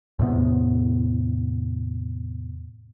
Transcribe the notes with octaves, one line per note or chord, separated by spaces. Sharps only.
E2 A2 C3 B3